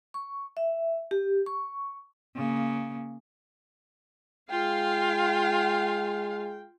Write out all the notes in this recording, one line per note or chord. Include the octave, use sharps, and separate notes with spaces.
C#6
E5
G4
C#6
C#3 A#3
G#3 F4 F5 G5